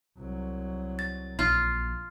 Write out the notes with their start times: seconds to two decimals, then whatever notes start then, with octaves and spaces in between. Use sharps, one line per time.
0.18 C2 F#3
0.99 A6
1.39 A#1 F4